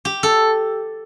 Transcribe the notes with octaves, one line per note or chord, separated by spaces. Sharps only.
G4
A4